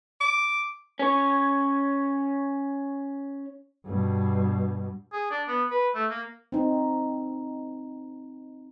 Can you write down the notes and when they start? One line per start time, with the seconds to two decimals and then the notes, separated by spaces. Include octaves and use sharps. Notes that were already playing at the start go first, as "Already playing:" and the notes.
0.21 D6
0.99 C#4 C#5
3.86 G2 B2
5.12 G#4
5.31 D4
5.47 B3
5.71 B4
5.95 A3
6.10 A#3
6.52 C4 D#4